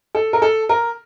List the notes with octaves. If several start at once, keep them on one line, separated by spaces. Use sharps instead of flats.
A4
A#4
A4
A#4